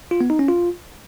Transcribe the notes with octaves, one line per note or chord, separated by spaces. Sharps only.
F4
B3
D#4
C#4
F4